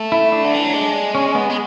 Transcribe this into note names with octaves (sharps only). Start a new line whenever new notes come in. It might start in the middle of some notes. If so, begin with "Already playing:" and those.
Already playing: A3
E4
D4
D3
E3
F#3
G#3
C#4
B3
G#3